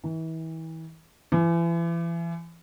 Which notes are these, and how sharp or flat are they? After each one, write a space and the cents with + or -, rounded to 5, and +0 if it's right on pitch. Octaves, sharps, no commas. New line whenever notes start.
E3 -35
E3 +35